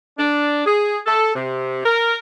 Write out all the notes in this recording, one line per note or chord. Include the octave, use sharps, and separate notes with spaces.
D4
G#4
A4
C3
A#4